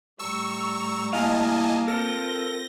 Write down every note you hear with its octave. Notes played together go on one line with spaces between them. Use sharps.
A2 G3 A#5 C#6 E6
A#3 E4 D#5 F5 G#5 A5
C4 F4 A4 A#4 G6 A#6